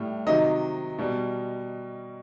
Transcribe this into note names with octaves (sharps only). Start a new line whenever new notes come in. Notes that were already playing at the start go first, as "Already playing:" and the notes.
Already playing: A2 G3
C3 D#3 F#3 D#5
B2 G3